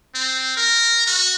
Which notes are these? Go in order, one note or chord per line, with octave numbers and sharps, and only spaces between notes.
C4
A#4
F#4